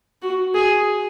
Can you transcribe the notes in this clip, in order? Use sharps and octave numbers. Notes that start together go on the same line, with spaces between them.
F#4
G#4